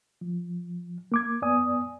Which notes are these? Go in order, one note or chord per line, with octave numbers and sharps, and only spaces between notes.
F3
A#3 D6 G#6
F#2 B3 D5 G#5 D#6